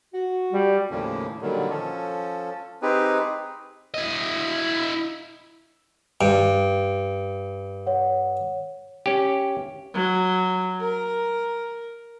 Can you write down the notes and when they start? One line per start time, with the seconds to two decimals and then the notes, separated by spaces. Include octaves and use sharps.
0.13 F#4
0.53 G3
0.90 D#2 A2 C#3 F3 A#3 C#4
1.41 A#2 D3 D#3 F#3 G3
1.70 F3 C#4 A4
2.82 C4 D#4 G4 G#4 B4
3.94 E4 D#5
6.21 G2 D7
7.86 C#5 F#5
9.06 C#4 G4
9.94 F#3
10.81 A#4